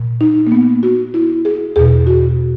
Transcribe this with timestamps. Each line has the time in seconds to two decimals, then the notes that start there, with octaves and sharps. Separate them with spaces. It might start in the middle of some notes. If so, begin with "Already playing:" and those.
Already playing: A#2
0.21 D#4
0.47 A#3
0.52 B3
0.83 F#4
1.14 E4
1.45 G#4
1.76 E2 B2 G#4
2.07 F#4